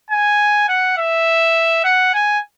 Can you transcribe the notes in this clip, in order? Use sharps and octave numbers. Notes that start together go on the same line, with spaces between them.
G#5
F#5
E5
F#5
G#5